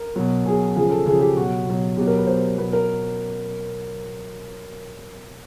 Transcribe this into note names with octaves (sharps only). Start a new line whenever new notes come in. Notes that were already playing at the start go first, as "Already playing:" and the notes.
Already playing: A#4
B2 F#3
B2 F#3 G#4
C#3 F3 G#4
A4
C#3 F3 G#4
G4
B2 F#3 F#4
B2 F#3
B2 F#3 G4
A#4
B4
B2 F#3 C5
B2 F#3 B4
A#4